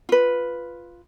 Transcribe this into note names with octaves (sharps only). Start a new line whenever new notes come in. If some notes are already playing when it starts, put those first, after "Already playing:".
F4 B4